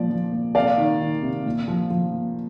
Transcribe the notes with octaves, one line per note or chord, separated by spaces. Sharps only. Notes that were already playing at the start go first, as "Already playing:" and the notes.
Already playing: A#2 F3 D5
F3
A#2
C3 D5 F5
D#3
D#3
C3
A#2
F3
F3
A#2